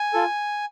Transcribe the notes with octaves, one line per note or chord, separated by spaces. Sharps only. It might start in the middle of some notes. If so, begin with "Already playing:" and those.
Already playing: G#5
F4 A4